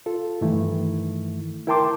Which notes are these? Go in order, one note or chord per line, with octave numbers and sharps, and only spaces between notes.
F4 A4
G2 D#3 E3 A3 E4
E4 A#4 G5 A5 C6 D6